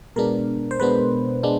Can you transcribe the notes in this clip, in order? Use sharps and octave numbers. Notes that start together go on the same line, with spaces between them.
B2 G#3 B3 D4 A#4
C5
B2 G#3 B3 D4 B4
G#3 B3 D4